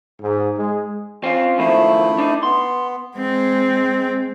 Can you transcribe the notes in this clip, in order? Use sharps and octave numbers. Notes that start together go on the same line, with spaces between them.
G#2
G#3
C4 C#4 F4
F#2 D#3 F3 A3 E4
D4 D#4
B3 C6
G#3 C4